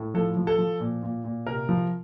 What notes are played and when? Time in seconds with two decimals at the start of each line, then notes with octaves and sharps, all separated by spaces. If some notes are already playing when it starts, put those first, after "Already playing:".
Already playing: A2
0.14 F3 A4
0.37 F3
0.47 A4
0.59 F3
0.80 A#2
1.03 A#2
1.24 A#2
1.46 C3 A#4
1.69 F3